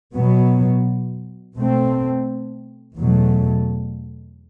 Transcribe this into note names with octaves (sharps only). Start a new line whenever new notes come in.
B2 F#3 B3
B2 A3 C4
E2 B2 F#3 A3